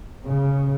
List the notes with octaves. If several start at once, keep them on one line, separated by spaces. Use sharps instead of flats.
C#3